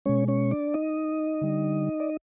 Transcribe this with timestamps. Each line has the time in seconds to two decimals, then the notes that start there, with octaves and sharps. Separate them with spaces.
0.06 B2 G#3 C#4 C#5
0.28 C#4 C#5
0.51 D4 D5
0.74 D#4 D#5
1.41 D3 G3
2.00 D5